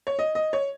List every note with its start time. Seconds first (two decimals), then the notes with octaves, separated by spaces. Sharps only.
0.07 C#5
0.19 D#5
0.35 D#5
0.53 C#5